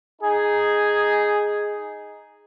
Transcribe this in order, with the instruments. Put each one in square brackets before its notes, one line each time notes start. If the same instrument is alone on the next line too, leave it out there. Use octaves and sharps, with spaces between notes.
[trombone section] D#4 G#4